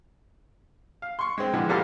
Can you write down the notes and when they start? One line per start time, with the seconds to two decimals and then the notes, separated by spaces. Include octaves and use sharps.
1.02 F5
1.19 C6 C#6
1.38 G#3 C4
1.54 D3 E3 F3 G#3 B3
1.69 E2 A#2 G3 A#3 A4 F6